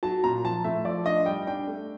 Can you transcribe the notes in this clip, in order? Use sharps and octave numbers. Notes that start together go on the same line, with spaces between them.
F#3 A5
A#2 A#5
F3 A5
A2 E5
F3 D5
D4 D#5
G3 G5
D4 G5
A3